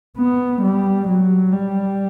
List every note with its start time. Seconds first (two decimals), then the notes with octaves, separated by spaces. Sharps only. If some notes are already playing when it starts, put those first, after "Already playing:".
0.17 B3
0.62 G3
1.08 F#3
1.52 G3